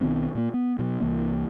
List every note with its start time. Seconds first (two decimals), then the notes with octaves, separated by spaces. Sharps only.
0.01 B1 D#3 B3 C4
0.35 A#2 A#3
0.54 B3
0.79 B2 F#3
1.01 C2 E3 A#3